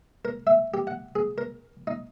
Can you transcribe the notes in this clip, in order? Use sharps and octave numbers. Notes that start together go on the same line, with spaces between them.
A#4
E5
G4
F#5
G#4
A#4
D#4